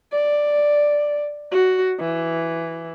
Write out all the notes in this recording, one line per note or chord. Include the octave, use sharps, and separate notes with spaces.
D5
F#4
E3